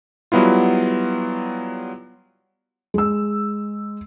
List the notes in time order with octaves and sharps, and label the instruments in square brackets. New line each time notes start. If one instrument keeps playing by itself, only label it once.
[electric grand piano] F#3 G3 B3 E4 F4
[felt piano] G#3 E6